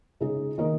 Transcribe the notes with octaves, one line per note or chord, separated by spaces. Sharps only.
C#3 G#3 D#4 G#4
D#3 A#3 D#4 A#4 D#5